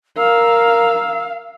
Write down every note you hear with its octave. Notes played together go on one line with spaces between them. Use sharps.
A#4 F5 E6